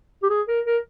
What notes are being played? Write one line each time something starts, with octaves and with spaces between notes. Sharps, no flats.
G4
G#4
A#4
A#4